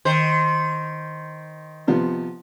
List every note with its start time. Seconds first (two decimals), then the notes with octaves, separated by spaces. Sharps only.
0.05 D#3 C5
1.87 C3 F3 B3